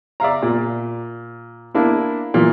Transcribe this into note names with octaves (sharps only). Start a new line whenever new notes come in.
D5 E5 F5 A#5
A#2
A#3 D4 E4
A#2 E3